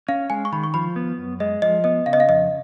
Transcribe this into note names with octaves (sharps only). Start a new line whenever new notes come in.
C#4 F5
G#3 G#5
C#6
D#3 B5
C#6
F3 B5
B3
F#2
G#3 D#5
F3 D#5
B3 D#5
C#3 F5
D#5
F5
F2 D#5